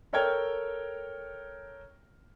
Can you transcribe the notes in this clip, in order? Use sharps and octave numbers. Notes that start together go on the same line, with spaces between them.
A4 A#4 C#5 G5 F6 G#6